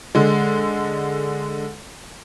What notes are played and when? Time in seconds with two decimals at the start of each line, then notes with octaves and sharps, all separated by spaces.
0.15 D3 G#3